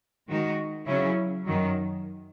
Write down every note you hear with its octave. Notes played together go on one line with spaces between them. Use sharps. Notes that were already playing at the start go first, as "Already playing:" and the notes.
D#3 G#3 D#4 F#4
C#3 F#3 C#4 E4
F#2 D#3 F#3